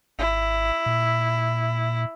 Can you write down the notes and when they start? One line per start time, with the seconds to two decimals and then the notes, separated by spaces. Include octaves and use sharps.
0.19 G#1 E4
0.86 A#2